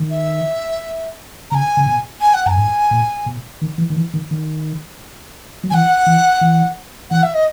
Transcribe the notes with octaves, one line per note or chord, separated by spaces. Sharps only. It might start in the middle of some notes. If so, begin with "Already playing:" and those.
Already playing: D#3
E5
C#3 G#5 A#5
C#3
B2
G#5
F#5
F#2 G#5 A#5
G#2
A#2
B2
D#3
E3
D#3
E3
D#3
D#3
F#3
E3 F#5 G#5
E3
E3
E3 F#5
E5
D#5